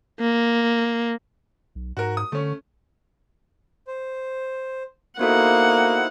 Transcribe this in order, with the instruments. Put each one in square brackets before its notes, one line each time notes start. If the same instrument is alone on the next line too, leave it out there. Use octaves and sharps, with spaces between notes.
[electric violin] A#3
[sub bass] B1
[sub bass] G#2 [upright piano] F#4 A#4
[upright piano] D#6
[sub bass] D3 [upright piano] A3 C#4
[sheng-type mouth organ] C5
[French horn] A#3 [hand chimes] B3 F#4 A4 [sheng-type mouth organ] D#4 E4 C5 [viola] F#5